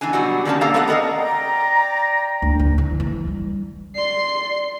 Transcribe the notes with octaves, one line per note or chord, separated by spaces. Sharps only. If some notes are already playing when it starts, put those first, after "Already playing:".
E3 B3 D4 G#5
B2 F#3 G3 F#4
D3 D#3 G3 A#3 C#4 A5
B2 A#3 G4 A4 F5 A#5
A3 B3 A4 C5 F#5
G#4 A#4 D#5 F#5 A#5
D5 G5 A#5
D2
D2
E3
E3
G3
D5 C6 C7